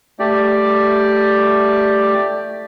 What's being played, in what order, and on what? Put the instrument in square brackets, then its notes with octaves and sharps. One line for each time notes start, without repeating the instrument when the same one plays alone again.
[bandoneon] A3 G4 D5